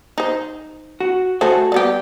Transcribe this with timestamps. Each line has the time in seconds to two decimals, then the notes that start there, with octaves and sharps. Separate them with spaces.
0.18 D#4 C5
1.00 F#4
1.41 A3 F#4 G#4 A4 C5
1.72 G3 B3 G4